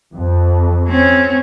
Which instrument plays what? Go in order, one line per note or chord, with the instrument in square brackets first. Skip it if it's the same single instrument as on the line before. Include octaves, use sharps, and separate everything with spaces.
[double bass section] F2
[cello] C4 C#4